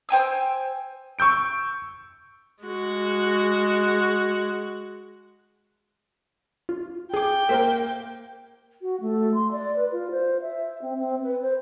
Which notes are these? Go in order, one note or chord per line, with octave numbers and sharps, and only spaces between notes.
C5 G5 G#5 E6
C#6 E6 G6 D7
G#3 F#4
F4
G#4 G5 D6
A#3 A#4 C5 E5
F#4
A3
C6
D5
B4
F4
C5
E5
C4
C4
B4
C5